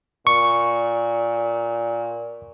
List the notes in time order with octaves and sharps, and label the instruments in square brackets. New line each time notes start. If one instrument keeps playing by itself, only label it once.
[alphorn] A#2 [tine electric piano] C#6